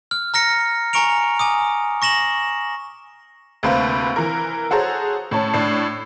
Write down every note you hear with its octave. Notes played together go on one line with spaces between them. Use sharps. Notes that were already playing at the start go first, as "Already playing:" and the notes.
F6
A#5 F6 A#6 C#7
G#5 A#5 C#6 C#7 D7 F7
G#5 D6 D#6
C#6 A#6 E7 F#7
D2 C3 A#3 B4 C5
E3 A#4
F#4 G#4 A4 C5 C#5 A#5
A2 C#4 A5
A2 D4 C7